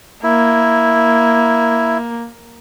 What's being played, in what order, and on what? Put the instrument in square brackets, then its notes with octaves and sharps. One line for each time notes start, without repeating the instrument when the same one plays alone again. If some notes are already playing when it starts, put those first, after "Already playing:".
[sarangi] A#3 [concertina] E4